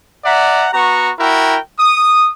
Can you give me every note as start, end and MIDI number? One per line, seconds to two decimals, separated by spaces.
0.24 0.68 74
0.24 0.68 76
0.24 0.68 78
0.24 0.68 82
0.73 1.11 59
0.73 1.11 66
0.73 1.11 82
0.73 1.11 85
1.19 1.58 64
1.19 1.58 66
1.19 1.58 70
1.19 1.58 79
1.78 2.30 87